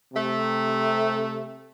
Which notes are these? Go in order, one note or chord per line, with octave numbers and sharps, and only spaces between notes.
C3 A3